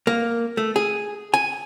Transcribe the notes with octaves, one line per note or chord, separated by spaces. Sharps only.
A#3
A3
G#4
G#5